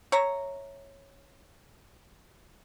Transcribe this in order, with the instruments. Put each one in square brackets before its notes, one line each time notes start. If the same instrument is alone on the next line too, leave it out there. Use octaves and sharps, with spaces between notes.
[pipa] C#5 E5 A#5